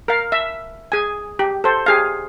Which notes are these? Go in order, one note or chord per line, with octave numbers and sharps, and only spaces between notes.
A#4 F5
E5
G#4 G#5
G4
A4 C5
G4 G#4 F5